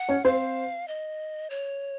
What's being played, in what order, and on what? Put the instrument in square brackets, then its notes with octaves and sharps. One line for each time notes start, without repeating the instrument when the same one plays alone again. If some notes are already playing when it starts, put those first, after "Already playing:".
Already playing: [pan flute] F#5
[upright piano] C#4 C#5
[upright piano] C4 C5 [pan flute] F5
[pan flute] D#5
C#5